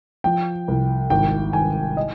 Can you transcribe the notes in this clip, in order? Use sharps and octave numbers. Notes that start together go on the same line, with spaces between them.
F3 G5
C2
G#1 G5
G#1 G#5
D#5